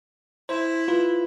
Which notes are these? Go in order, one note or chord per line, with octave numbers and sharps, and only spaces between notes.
E4 C5
F4 B4